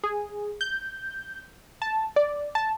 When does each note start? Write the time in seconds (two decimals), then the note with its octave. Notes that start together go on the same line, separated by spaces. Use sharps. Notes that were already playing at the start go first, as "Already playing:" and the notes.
0.04 G#4
0.61 G6
1.82 A5
2.16 D5
2.55 A5